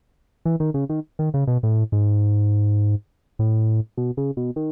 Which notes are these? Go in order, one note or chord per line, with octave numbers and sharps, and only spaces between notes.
E3
D#3
C#3
D#3
D#3
C#3
B2
A2
G#2
A2
B2
C#3
B2
D#3